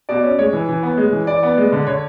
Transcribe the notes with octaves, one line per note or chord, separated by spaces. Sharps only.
B2 D5
C#4
G#3 C#5
E3
E3
B3
G#3
E3
E3 D5
B3
G#3
D3
D3 C#5